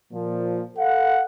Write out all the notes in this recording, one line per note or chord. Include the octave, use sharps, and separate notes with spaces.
A#2 F3
A4 F5 F#5